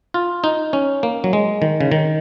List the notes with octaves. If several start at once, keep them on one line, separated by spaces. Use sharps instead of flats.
F4
D#4
C#4
A#3
F#3
G#3
D#3
C#3
D#3